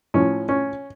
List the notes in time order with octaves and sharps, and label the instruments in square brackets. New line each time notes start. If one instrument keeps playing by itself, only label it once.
[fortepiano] A2 F3 C#4
C#4